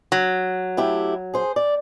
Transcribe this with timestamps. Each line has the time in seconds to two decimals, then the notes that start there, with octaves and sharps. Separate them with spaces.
0.12 F#3
0.77 A3 E4 G4
1.34 G#4 C5
1.56 D5